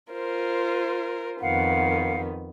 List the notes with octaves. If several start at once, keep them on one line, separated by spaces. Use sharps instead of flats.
F4 A#4 C5
F2 D#3 B3 F5 F#5